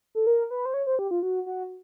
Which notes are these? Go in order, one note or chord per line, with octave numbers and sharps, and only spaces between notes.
A4
A#4
B4
C5
C#5
C5
G4
F4
F#4
F#4